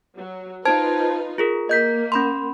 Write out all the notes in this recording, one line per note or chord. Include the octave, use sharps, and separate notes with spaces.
F#3
D#4 F4 B4 C5 A5 G#6
F4 G#4 A#4
A#3 D#5 G6 B6
C#4 B5 C6